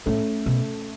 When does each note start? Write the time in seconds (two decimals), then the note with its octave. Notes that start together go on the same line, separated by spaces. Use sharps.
0.06 A2 A3 C#4
0.46 B2